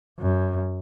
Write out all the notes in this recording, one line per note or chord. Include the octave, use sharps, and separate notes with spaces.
F#2